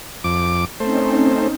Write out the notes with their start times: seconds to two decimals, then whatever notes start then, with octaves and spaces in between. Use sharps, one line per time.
0.24 F2 D6
0.80 A3 C4 C#4 D#4 C5